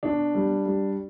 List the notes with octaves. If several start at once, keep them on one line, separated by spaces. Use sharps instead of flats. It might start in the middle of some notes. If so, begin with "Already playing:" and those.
B2 D4
G3
G3